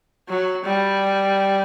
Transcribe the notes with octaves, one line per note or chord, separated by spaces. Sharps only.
F#3
G3